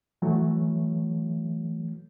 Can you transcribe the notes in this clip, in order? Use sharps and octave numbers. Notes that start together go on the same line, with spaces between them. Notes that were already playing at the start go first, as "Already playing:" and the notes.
E3 F#3 A3